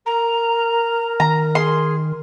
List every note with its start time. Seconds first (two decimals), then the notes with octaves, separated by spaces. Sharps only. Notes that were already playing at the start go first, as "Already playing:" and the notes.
0.06 A#4 A#5
1.20 D#3 A#5
1.55 G#4 C6